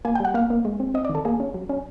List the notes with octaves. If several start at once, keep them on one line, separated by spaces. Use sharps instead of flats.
A#3 G#5
G5
G3 F#5
A#3 F5
A#3
G#3
C4
C4 D#5
D5
D#3
A4
A#3 G#4
C#4
F#3
C#4